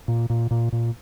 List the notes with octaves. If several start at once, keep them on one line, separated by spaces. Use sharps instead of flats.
A#2
A#2
A#2
A#2